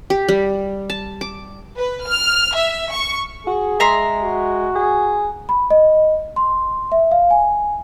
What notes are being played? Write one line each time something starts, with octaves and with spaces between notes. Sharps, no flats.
G4
G3
A5
D6
B4
F6
E5
C#6
F#4 G#4
G#3 E5 A#5 C6
F#4
G#4
B5
D#5
C6
E5
F5
G#5